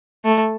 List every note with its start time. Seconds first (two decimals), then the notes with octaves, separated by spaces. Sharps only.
0.25 A3